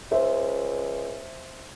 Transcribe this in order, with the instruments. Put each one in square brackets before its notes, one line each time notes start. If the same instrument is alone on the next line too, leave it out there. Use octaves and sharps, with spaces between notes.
[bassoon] C#2 [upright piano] C5 E5